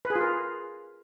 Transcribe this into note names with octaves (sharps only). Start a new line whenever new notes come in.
B4
G#4
F4
A#4